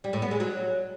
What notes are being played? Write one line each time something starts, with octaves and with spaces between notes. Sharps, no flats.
G3
A2
B3
G#3
F#3